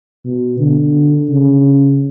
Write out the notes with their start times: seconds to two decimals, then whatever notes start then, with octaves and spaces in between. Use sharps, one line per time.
0.25 B2
0.60 D3
1.30 C#3